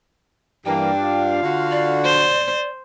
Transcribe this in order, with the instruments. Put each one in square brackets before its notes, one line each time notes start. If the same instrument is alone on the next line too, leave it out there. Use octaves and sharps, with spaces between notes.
[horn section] G2 D4 [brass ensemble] E3 G3 A#3 [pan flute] G5
[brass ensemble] F4 F5
[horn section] D3 F#4
[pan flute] D5
[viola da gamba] C5